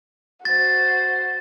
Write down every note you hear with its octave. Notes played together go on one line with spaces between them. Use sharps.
F#4 C5 A6